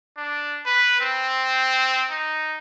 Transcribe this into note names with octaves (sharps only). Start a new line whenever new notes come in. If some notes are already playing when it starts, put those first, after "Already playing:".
D4
B4
C4
D#4